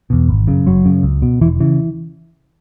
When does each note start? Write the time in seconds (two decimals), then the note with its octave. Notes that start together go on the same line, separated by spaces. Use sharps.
0.10 E2 B2
0.29 G#1
0.47 F#2 C#3
0.66 F#1 F#3
0.85 F#2 C#3
1.03 C#2
1.22 B2
1.41 E1 E3
1.60 C#3 E3